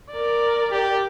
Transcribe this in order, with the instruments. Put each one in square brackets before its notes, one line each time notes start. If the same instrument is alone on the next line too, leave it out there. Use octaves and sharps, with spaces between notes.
[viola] A#4 D5
[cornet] G4